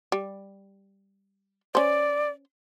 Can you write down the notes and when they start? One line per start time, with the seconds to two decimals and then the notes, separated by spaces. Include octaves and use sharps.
0.12 G3
1.75 C#4 C5 D5